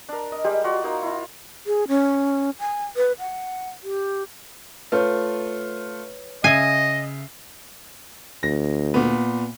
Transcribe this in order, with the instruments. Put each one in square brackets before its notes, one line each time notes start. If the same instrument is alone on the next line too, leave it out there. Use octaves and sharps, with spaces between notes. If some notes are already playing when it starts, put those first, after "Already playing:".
[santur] D4 A#4
D#5
G3 G#3 G4
F4 F#4 D5
A#3 D#4
E4 F4
[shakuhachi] G#4
C#4
G#5
B4
F#5
G4
[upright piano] A3 F4 [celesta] B4 C#5
[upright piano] C#3 E5 C7 [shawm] D#5 [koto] G#5
[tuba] D2 [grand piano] A#6
[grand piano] A#2 B3